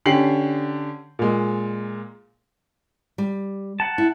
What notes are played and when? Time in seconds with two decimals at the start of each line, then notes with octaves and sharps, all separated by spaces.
0.06 D3 C#4 G4 C7 F#7
1.19 A#2 G#3
3.18 G3
3.80 F#5 A5
3.98 E4